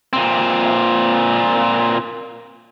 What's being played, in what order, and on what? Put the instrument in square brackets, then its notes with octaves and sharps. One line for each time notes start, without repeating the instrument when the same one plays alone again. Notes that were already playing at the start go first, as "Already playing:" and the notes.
[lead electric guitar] A#2 C4